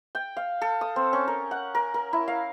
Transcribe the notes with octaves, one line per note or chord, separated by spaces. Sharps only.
G5
F5
A4
D#6
C4
C#4
A#4
F#5
A#4
A#4
E4
F5